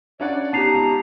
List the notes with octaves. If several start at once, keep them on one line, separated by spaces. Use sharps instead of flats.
C#4 D4 D5 F#5
B3 D#4 G4 A5 A#5 C7 F7
C#2